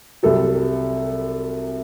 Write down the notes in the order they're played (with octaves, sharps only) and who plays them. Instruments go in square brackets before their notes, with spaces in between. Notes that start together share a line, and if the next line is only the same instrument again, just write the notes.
[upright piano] C2 C3 F#3 A4